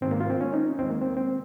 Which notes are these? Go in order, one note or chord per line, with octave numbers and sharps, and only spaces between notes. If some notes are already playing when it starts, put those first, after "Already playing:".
G#2 D#3 G#3 C4
A#3
F4
C4
C#4
D#4
D#2 D#3 G#3 C4
A#3
C4
C4